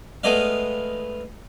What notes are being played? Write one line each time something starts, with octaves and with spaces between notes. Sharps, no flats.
G#3 A3 B3 D5 D#5 F5